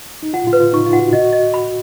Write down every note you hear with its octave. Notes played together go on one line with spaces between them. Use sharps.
D#4
F4 F#5
F4
B4
F4
D#4 C#6
F4
F#5
F#4
F#4 D#5
D#5
B5